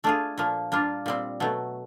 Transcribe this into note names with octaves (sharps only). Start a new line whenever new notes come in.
A3 D4 F4 G#4
A#2 F3 A#3
G3 A#3 D4 F4
A#2 G3 C4
B2 F#3 A3